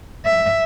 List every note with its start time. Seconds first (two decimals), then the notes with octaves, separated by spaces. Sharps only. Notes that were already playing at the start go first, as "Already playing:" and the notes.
0.25 E5